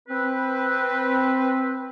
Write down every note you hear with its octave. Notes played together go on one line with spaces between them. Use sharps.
C4 B4